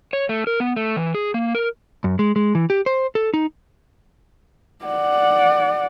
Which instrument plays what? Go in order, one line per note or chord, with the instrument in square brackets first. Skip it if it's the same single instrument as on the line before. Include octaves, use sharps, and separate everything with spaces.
[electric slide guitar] C#5
A3
A#4
B3
A3
E3
G#4
A#3
A#4
F#2
G#3
G#3
E3
G4
C5
A4
D#4
[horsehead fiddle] D5 F#5